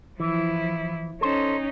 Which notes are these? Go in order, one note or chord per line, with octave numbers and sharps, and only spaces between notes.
E3 F3 E4
C#4 D#4 A4 C5